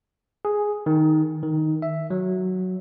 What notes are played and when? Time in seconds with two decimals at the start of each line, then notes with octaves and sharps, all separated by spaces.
0.45 G#4
0.86 D#3
1.43 D#3
1.82 E5
2.10 F#3